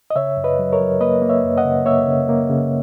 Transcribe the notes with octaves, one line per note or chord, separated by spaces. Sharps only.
D#5
C#3 C#5 E5
F#2
B4 D#5
F#3
A#4 C#5
F#3
A#3 B4 D#5
A#3
C#5 E5
F#2
D#5 F#5
C#3
A#3 C#5 E5
C#3
A#3
C#3